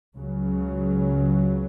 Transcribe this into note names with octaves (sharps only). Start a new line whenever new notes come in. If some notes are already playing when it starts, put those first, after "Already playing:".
C#2 C#3 F#3